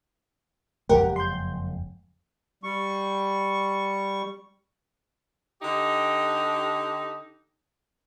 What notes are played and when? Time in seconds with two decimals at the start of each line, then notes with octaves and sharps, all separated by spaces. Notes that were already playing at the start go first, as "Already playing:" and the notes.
0.89 F#1 F2 G#3 G4 A#4 F#5
1.16 C6 G6
2.63 G3 C#6
5.62 D3 D#4 G4